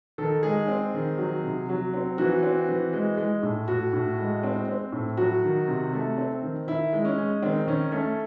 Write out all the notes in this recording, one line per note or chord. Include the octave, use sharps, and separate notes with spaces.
D#3 A4
G#3 G#4
C4
D#3
F#3
C3
F#3
C4
E3 F#4
C4
E3
G#3
G#3
A2
A2 F#4
A2
G#3
C4
C4
A2
F#3 F#4
D#3
C3
A3
C4
D#3
D#3 E4
G#3
C#4
G#3
D#3 C4
D#3 C#4
A3 C#4